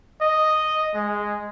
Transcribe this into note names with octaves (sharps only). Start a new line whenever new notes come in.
D#5
G#3